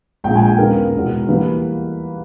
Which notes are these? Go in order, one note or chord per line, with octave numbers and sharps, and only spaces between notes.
A#1 A#2 G#3 G5
G#5
G5
D#2 C#3 G#3 B3 A#4
E2 B2 G#3 B3
E3 G3 A#3 B4